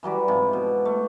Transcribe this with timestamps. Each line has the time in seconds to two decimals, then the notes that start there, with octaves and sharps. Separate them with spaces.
0.03 E3 F#3 G3 D5
0.28 G#2 C3 F3
0.53 B2
0.85 A3